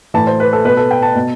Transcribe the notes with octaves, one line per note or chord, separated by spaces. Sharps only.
A2 E3 A5
C5
B4
A4
B2 B4
A4
G5
A5
B2